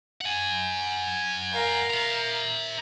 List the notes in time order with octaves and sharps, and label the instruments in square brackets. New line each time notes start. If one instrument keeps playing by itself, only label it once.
[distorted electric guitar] F#5 G#5
[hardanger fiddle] A#4 F5
[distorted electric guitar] E5 A#5